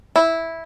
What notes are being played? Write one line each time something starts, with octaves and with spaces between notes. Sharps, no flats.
E4